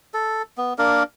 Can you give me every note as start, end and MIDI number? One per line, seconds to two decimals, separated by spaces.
0.14 0.42 69
0.58 0.73 59
0.78 1.03 58
0.78 1.03 62
0.78 1.03 70